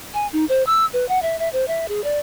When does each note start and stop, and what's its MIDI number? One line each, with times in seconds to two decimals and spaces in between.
0.14 0.27 80
0.33 0.45 63
0.49 0.63 72
0.67 0.85 88
0.93 1.07 71
1.09 1.21 78
1.22 1.39 76
1.39 1.49 76
1.53 1.65 72
1.68 1.88 76
1.88 2.03 68
2.04 2.19 74